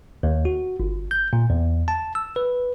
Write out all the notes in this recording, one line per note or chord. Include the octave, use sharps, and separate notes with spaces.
D#2
F#4
G1
G6
A#2
E2
A5
E6
B4